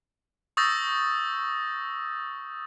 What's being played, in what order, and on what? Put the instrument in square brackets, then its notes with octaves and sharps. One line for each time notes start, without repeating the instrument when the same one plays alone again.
[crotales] C#6 D#6 E6 G6 A6 A#6